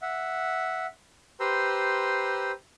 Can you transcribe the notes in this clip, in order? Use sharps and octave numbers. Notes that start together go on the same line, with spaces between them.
E5 F#5
G4 B4 C5 A#5 C6 E6